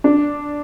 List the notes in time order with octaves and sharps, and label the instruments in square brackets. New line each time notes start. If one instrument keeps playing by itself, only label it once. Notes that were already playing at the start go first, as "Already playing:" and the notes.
[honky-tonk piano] D4